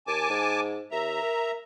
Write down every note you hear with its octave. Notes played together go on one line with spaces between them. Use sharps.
D#2 G#5 A5 D6
G#2
D#2 E5 A#5
A#4